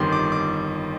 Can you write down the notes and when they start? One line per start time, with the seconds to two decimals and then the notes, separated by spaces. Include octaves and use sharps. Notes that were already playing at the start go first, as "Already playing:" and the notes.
Already playing: G1 F2 D#3 G3 C6 D6
0.12 D6
0.32 D6